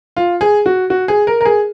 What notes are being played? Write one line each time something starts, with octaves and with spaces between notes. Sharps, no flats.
F4
G#4
F#4
F#4
G#4
A#4
A#4
G#4